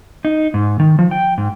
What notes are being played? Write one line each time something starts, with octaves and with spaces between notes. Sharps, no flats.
D#4
G#2
D#3
F3
G5
G#2